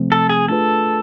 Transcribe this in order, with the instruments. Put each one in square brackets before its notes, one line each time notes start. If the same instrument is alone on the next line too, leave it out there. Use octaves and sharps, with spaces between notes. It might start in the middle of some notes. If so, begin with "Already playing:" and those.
Already playing: [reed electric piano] C3 F3 A3 C4
[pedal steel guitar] A4
G#4
[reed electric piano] A3 D4 F4 G#4 B4 [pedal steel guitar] A4